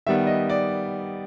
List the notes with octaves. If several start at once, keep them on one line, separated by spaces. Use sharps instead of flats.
D#3 G3 B3 E5
D#5
D5